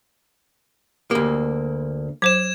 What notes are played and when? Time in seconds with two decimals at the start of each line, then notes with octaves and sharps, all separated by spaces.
1.11 D2 A#3 G4
2.22 F#3 C5 G#6 E7